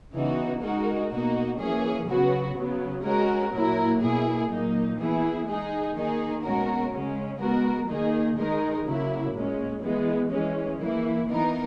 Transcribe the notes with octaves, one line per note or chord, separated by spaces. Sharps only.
C#3 E3 B3 D#4 F#4
G#3 D#4 F#4 A#4
B2 A#3 D#4 F#4
E3 A#3 C#4 G#4
C#3 F#3 B3 F#4
C#3 F#3 B3
G#3 C#4 F#4 A#4
A#2 F#3 A#3 E4 A#4
B2 A#3 E4 G#4
A#2 F#3 A#3 D#4
E3 B3 E4 G#4
G#3 D#4 G#4
D#3 A#3 D#4 G#4
B2 G#3 C#4 F#4 A#4
C#3 G#3 C#4
G#3 B3 F#4 A#4
D#3 A#3 D#4 G#4
D#3 G#3 D#4 A#4
C#3 F#3 A#3 E4
A#2 G#3 C#4
E3 G#3 B3
E3 G#3 C#4
E3 A#3 E4
E3 B3 D#4 A#4